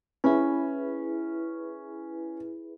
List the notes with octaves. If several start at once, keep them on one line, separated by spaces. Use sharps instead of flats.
C#4 E4 G#4 B4